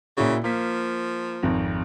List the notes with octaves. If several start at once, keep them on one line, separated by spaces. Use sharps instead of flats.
A#2 C#3 E4 F#4
F3 A#3 B6
G#1 F2